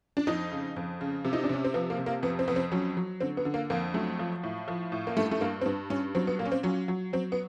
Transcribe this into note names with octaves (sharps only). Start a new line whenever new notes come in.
D4
F2 D#4
C#3
F2
C#3
C3
D#4
D4
C3 C#4
C4
F3 B3
A#3
C3
A#3
F2 B3
C4
F2 B3
C4
F#3 C#4
F#3
D3 C4
B3
D3
A#3
F2 A#3
F#3 A3
F3
A2
F3
A2
A#3
G2 A3
A3
G2 A#3
C4
G2 B3
G2 C#4
F#3 C4
B3
A#2 A#3
C#4
C4
F#3 C#4
F#3
F#3 C4
B3